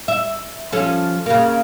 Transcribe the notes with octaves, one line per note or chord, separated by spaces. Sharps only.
E5
F3 C#4 A4
C#3 A#3